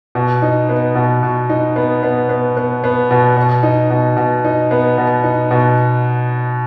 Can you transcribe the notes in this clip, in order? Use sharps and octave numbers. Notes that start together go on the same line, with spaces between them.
B2
D#4
B3
B2
B2
D#4
B3
B3
B3
B3
B3
B2
B2
D#4
B2
B2
D#4
B3
B2
D#4
B2